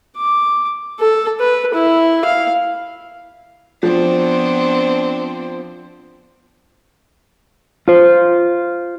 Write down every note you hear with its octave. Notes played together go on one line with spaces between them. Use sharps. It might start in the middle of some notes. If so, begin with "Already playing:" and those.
D6
A4
B4
E4
F5
F3 B3 C4 D4
F4 C5